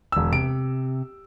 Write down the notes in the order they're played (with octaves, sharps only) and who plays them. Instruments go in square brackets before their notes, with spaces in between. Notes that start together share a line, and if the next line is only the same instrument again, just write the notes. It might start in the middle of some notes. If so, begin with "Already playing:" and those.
[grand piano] E1 E6
[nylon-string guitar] C3 [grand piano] D7